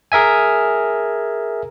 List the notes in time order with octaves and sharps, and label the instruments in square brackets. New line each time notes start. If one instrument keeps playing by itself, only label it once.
[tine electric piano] G#4 A#4 E5 G#5